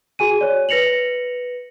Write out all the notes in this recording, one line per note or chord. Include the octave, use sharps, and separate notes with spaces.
F#4 G#4 G#5 D#7
C#5 D5
B4 A#6 C#7 F7 F#7